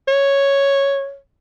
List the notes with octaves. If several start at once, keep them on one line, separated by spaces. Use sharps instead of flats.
C#5